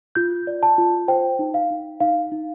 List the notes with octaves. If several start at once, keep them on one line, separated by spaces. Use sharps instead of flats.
F4 G6
D5
A5
F4
C5 G5
D#4
F5
D#4
D#4 F5
D#4